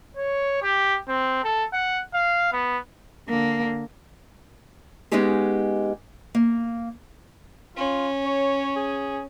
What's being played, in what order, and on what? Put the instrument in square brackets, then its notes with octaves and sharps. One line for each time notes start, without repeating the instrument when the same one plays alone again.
[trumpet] C#5
G4
C4
A4
F#5
F5
B3
[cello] D3 A#3
[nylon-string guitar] G#3 B3 C#4 D#4 G4 G#4
A#3
[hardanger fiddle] C#4 [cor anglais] F4
[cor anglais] C#5
G#4